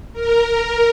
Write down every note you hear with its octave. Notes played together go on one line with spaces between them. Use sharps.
A#4